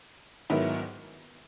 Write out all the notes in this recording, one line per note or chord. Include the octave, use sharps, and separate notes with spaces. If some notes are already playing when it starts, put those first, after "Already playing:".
G#2 D#3 F#3 B3 E4